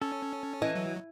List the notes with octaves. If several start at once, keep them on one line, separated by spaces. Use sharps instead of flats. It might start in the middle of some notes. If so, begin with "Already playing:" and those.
C#4 A4
E3 D#5
F#3